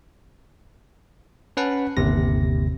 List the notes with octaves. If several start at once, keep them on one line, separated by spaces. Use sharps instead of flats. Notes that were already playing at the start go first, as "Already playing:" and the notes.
C#4 B4 F#5 A5
G1 D#2 C3 A#6